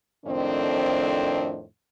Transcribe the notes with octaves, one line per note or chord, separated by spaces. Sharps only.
F2 A2 D#3 C4 D4